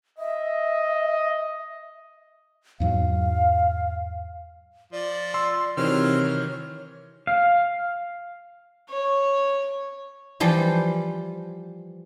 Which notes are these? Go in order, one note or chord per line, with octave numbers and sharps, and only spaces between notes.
D#5 E5
E2 G#2 F#3 F5
F3 D5
C6 E6
C3 D#3 E3 F#3 C5 C#5 F6
F5
C#5
E3 F3 G3 C5